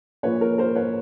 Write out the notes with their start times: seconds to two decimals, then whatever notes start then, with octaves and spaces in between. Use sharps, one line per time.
0.23 A#2 F3 A#3 B4 C#5
0.41 A#4
0.58 A#4 C5
0.75 B4 C#5